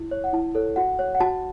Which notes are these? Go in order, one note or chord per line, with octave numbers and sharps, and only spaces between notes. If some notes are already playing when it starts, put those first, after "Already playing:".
Already playing: E4
C#5
F#5
E4 A5
A4 C#5
F#4 F#5
C#5
F#5
F#4 A5